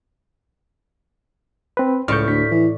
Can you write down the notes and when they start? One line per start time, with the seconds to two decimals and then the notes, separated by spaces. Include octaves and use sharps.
1.77 C4 B4
2.08 C#2 A2 D5 C#6 F6 G6
2.28 D2 B6
2.51 E3